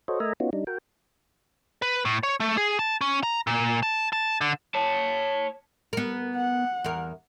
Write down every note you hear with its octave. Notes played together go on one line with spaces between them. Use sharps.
F#4 A4 C5 C#5 D#5
A3 A#4 D#5 E5 G#5 A#5
B3 C#4 D#4 F4 F#4
G3 D4 D#4
F#4 A#4 G5
B4
A2
C#5
A3
G#4
A5
C#4
A#5
A#2
A5
A5
D3
C#5 A5
B3 A#4
F#5
E2 A#4